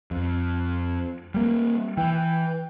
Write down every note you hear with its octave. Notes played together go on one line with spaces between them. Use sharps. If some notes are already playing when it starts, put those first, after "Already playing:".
F2
G3 A#3
E3 G5